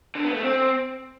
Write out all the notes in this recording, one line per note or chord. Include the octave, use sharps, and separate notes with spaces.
D3
B3
A3
C4